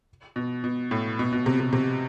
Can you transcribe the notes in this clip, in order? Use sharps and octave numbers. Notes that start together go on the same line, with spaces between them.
B2
B2
A2
B2
B2
C3
C3
C3